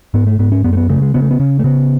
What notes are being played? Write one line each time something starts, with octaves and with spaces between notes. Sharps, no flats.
G#2 B3
A3
G#2 B3
C#4
F#2 B3
A3
B3
C#3 A3
G#3
C#3 B3
A3
B3
C#3 C#4
A3
C#3 B3